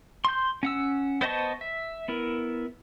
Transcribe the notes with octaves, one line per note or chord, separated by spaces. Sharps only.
C6 G6
C#4 F#5 E6
B3 C5 D#5 A5 C#6
E5
B3 E4 A#4